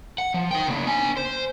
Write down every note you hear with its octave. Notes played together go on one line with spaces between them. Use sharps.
F#5
F3
D#4 G5
C#3 A#3
D4 G#5
C5